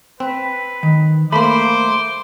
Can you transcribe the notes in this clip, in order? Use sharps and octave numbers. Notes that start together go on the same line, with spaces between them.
C4 B4
D#3
A3 A#3 C5 B5 D6